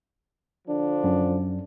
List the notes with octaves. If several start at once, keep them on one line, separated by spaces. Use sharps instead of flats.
D3 F3 D4
F#2